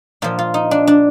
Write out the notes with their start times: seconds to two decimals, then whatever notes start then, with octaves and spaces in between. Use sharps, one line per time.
0.22 A#2 F3 F4
0.39 F4
0.54 D#4
0.71 D4
0.87 D4